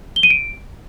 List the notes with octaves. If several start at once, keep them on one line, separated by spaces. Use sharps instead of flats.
G7
D#7
D7